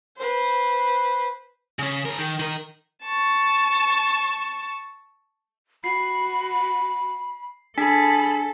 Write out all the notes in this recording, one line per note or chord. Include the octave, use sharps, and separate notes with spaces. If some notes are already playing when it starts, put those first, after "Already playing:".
B4 C5
C#3 C#4
G#4 A#4
D#3
D#3 A#4
A5 C#6
F#4 B5 C7
D4 G#4 A4 G#5 B5 B6